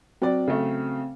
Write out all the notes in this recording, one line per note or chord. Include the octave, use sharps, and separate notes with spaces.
F#3 C4 D5
C#3 F#3 A3